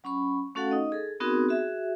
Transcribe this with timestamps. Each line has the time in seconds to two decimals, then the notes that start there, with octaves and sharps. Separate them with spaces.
0.04 F#3 C#4 B5 C#6
0.55 A3 C#4 F#4 A4 F5 F#5
0.71 D#4 D#5
0.92 G#4 A4
1.20 B3 C4 D#4 F#4 G#4 A#4
1.49 F#4 G#4 E5